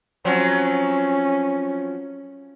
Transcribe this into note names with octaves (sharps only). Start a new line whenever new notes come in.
F3 F#3 C4 C#4